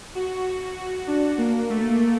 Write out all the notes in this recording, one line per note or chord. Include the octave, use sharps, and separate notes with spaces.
F#4
F#4
F#4
D4
A#3
A3